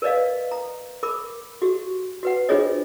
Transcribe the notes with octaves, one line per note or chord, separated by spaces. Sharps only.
A#4 B4 D5 D#5 F5
A#5
A#4 B5 D6
F#4 G4
F#4 B4 F#5
D4 F4 G#4 C5 C#5 D#5